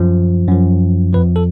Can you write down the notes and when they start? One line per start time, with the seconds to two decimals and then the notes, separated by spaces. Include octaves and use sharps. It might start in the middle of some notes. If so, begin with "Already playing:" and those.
Already playing: F#2 F3
0.47 F#2 F3
1.13 F2 F3 B4
1.36 A4